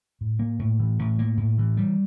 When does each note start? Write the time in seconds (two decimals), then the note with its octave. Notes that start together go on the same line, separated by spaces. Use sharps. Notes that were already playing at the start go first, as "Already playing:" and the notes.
0.21 A2
0.39 A#3
0.59 A2
0.80 E3
0.99 A2
1.19 A#3
1.37 A2
1.58 E3
1.77 G3